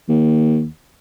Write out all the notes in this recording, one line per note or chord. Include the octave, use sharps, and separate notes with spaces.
D#2